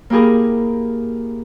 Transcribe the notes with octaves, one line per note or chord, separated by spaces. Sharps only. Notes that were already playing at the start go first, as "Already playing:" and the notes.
A#3 E4 G4 G#4 A#4